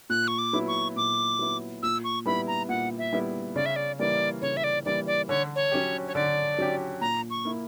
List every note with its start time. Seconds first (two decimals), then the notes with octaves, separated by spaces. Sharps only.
0.10 A#2 F#6
0.28 C#6
0.38 D6
0.53 F#3 B3 E4
0.68 C#6
0.96 A#2 D6
1.39 F#3 B3 E4
1.83 A#2 E6
2.04 C#6
2.26 G3 B3 E4 B5
2.48 A#5
2.69 A#2 F#5
2.98 E5
3.13 G3 B3 E4
3.56 C#3 D5
3.66 E5
3.76 D5
3.99 E3 G3 A#3 D5
4.42 C#3 C#5
4.57 E5
4.64 D5
4.85 E3 G3 A#3 D5
5.07 D5
5.29 D3 C#5
5.55 C#5
5.71 F#3 C#4 G4
6.08 C#5
6.15 D3 D5
6.59 F#3 C#4 G4
7.01 A#2 A#5
7.30 C#6
7.45 A#3 E4